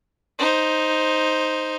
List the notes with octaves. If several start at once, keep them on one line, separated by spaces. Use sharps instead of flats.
D#4 C5